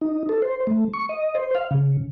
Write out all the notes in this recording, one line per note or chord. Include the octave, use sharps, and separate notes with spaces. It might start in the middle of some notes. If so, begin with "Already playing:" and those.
D#4
A4
C5
A3
C#6
D#5
C5
F5
C#3